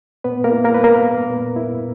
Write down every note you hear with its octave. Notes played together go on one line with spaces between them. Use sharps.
A#2 B3 B4
A#3 A#4
E4
A#3 A#4
G3 B4
A#3 A#4
B3
A#2
E4